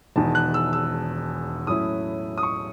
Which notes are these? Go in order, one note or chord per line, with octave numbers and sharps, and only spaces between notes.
E1 E2 D#3 A5
F#6
E6
E6
A2 F#3 C#4 E4 D#6
D#6
C#6